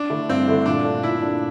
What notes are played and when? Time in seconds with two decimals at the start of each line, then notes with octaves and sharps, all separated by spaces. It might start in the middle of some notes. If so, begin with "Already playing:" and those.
Already playing: D4
0.10 D3 A3 E4 A4
0.29 G2 C4
0.47 D3 A3 E4 A4
0.66 A#2 D4
0.85 A3 D4
1.03 A#2 E4
1.22 A3 D4